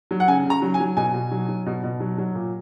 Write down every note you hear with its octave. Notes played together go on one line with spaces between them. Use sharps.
F#3
F#5
C#3 G#5
C#3 A#5
F#3
G#5
F#3
B2 G#5
B2
F#3
F#3
B2
B2
F#3
F#3
A#2